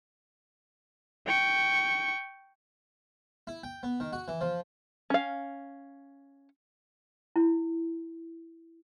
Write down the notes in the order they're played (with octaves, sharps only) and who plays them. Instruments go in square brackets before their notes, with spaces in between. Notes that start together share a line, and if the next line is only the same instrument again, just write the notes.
[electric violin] G5 C#6
[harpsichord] E4
G5
B3
D#3
F#4
E3
F3
[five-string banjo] C#4 F5
[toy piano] E4